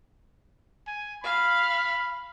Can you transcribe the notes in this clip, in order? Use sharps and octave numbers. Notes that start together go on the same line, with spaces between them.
G#5
F5 B5